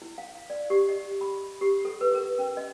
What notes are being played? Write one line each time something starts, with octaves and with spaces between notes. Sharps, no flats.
E4
F5
D5
G4
D#5
B5
G4
A4
B4
A#4
C#4
D#5